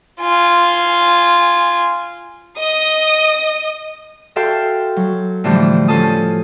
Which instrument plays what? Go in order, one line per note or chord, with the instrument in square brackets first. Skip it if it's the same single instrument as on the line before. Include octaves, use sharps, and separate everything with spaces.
[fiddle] F4 G#5
[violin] D#5 D#6
[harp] F#4 A4 E5 F5 G5 C6
F#3
A2 D3 E3 F3 G3 A3
F3 C#4 F4 A4 A5 D#6